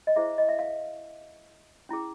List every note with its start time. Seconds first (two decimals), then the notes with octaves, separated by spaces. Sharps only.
0.07 D#5
0.16 E4 G#4 C5 E5
0.38 D#5
0.49 E5
0.59 F5
1.89 C#4 E4 G#4